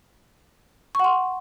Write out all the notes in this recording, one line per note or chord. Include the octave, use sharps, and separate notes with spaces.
F#5 C6 C#6